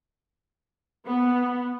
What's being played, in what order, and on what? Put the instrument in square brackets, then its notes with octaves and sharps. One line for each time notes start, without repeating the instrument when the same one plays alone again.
[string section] B3